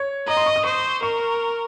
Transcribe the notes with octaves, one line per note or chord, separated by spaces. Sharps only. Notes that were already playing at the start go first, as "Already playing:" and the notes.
Already playing: C#5
D#5 A#5
C6
C#6
D#6
C5 C#6
A#4 C#6